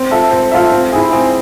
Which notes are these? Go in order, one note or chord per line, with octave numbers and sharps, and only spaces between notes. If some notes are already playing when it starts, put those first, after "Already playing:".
Already playing: C4
F4 A4 E5
C4
F4 A4 E5
C4
E4 G#4
C4